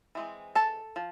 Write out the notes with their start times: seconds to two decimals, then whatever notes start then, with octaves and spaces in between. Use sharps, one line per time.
0.15 E3 G#3 C4
0.55 A4 A5
0.96 F3